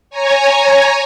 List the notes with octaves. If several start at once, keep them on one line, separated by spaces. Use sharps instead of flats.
C#5 G#5 A#5